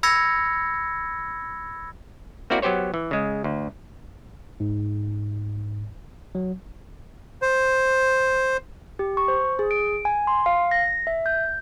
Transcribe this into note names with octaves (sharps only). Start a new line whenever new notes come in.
B5 E6 G#6 A#6 C#7
A#3 C4 E4 F#4 D5
F#3 B3 G4 C5 C#5
E3
C#3 G#3
D2
G#2
F#3
C5
G4
C#6
C5
G#4
D7
G#5
C6
F5
A#6
E5
G6